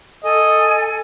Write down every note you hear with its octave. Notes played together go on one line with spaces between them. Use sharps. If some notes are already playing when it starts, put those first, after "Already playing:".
A4 D#5 G#5